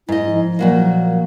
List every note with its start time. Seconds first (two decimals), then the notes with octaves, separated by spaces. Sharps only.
0.09 G#2 E4 D#5
0.31 F3
0.59 A#2 F#3 A#3